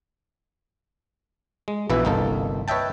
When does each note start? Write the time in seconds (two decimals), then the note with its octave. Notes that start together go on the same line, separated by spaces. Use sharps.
1.68 G#3
1.90 A#1 B2 E3 E4 B4 E5
2.05 G1 C2 A#3 D#4 A4
2.68 B4 C#5 D#5 E5 G5 A5